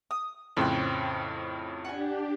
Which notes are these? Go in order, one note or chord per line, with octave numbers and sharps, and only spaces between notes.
D#6
F2 A2 C#3 B4 C5 G5
D4 G4 F#5 G#5